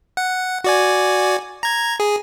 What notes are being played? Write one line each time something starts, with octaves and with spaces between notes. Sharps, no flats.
F#5
F#4 D5 G#5
A#5 G#6
G#4